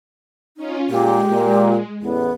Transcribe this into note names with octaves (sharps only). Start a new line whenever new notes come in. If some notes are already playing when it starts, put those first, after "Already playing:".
C#4 D#4 F4
A#2 G#3 G4
A#2
A1 E2 B3